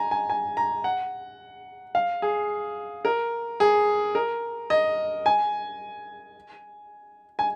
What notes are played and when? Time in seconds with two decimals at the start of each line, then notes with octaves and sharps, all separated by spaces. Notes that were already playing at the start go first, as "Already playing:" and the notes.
Already playing: G#5 A#5
0.11 G#5
0.29 G#5
0.57 A#5
0.84 F#5
1.95 F5
2.22 G#4
3.05 A#4
3.60 G#4
4.15 A#4
4.70 D#5
5.26 G#5
7.39 G#5